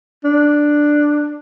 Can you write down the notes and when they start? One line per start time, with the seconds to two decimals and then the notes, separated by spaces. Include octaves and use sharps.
0.25 D4